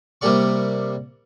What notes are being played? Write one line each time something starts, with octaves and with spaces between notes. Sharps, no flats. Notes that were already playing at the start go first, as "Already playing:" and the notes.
C3 G3 A#3 G4 D5 C#6